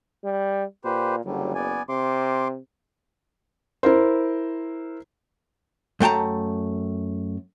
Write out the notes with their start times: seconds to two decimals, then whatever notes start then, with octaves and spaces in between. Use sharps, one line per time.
0.24 G3
0.85 A#2 G4 B4 C5
1.25 F#1 D3 F#3 G3
1.55 B3 D5 G#5
1.89 C3 C6 D6
3.83 E4 A#4 C5
6.00 F#2 A3 G5 A5 A#5